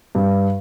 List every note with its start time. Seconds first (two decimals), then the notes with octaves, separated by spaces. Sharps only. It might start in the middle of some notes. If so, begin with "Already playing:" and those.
0.15 G2